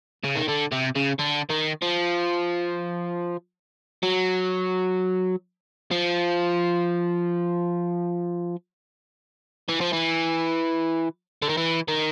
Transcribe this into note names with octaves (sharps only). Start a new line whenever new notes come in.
C#3
D#3
D3
C3
C#3
D3
D#3
F3
F#3
F3
E3
F3
E3
D3
D#3
E3
D#3